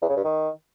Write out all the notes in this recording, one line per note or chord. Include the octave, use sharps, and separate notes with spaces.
E2
C#3
G2
D#3